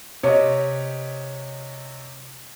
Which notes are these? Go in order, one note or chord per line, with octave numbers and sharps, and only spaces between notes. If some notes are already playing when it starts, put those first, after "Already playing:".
C3 C#5 D#5